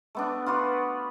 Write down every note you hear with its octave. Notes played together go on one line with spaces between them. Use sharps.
A3 B3 D4
F4 F#4 B4 D5